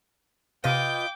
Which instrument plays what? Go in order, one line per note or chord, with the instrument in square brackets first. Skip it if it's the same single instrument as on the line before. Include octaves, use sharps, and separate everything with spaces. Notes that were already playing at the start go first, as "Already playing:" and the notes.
[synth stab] C3 D#7 [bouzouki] F4 B4 D#5 [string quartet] G5 D6 G6